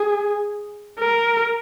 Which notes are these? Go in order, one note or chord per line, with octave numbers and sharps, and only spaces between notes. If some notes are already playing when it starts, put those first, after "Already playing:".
Already playing: G#4
A#4